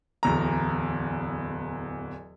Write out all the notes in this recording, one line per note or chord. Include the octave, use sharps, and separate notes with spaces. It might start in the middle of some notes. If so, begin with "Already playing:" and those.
D1 E2 A#5